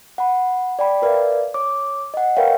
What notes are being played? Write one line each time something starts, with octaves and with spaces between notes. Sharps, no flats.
F#5 B5
D5 G5 B5
A#4 B4 D5 E5 F5
C#5 D6
D#5 F#5
A#4 B4 C#5 E5 F5 G5